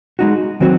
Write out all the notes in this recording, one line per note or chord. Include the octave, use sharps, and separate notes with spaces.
G#3 D#4 F#4
D#3 F#3 C4 F#4